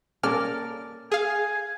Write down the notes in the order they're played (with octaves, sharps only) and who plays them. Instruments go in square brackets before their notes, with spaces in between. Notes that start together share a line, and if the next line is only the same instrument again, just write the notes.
[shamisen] A#3 C#4 A4 [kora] A#4 D5 [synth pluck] F6
[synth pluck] G#4 F5 [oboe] G#5